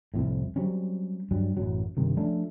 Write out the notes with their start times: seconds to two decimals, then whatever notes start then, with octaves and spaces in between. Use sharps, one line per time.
0.14 C2 F2 A2
0.56 F#3 G3 C4 C#4
1.31 G2 F#3 G3
1.57 A1 F#2 F#3
1.97 G1 G2 C3 D#3
2.17 F3 A3 C#4 D4